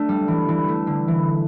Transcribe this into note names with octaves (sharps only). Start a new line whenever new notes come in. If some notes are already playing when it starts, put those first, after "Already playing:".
Already playing: A3 D4
G3
E3
E3
A3
D3
E3